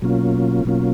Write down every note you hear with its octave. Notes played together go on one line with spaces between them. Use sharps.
B2 F#3 A#3 C#4 F4
B2 F#3 A#3 C#4 F4